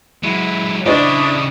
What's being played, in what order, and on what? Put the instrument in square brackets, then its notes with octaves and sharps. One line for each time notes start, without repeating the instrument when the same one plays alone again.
[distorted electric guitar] F#3 G#3 [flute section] E4
[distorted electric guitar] C#3 G4 [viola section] D4 [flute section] E4 C#6 D#6 [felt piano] C5 D#5